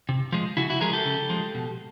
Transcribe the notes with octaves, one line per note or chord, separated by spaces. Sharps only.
C3
F3 G#3
C#3 E4 F#4
E4 F#4
F3 G#3 G#4 A#4
G4 A4
C#3
F3 G#3
B2